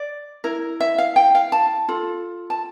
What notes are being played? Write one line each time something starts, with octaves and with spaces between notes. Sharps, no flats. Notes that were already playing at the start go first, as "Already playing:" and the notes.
Already playing: D5
E4 A#4
E5
F5
G5
F5
A5
F4 A4
A5